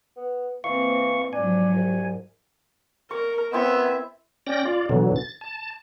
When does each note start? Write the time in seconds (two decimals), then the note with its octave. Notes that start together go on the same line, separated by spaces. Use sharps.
0.16 B3
0.64 E3 A#3 C4 F5 C#6
1.33 G#2 F3 F#3 D4 G#5
1.75 C2
3.11 A#4 C#6
3.53 B3 C4 E4 E5
4.47 C#4 D5 G5 A#6
4.65 F4 D5
4.89 B2 D3 E3 F#3
5.16 A6
5.41 A5